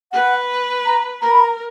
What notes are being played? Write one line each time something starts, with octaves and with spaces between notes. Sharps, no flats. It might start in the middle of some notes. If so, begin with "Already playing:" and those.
B4 F#5
A#5
A#4 A#5
B5
A#5